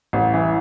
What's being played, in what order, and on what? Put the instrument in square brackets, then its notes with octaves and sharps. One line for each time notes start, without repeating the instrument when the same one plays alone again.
[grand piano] A1
E3